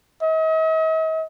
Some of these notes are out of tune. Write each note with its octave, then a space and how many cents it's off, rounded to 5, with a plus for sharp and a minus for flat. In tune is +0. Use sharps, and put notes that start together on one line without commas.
D#5 +45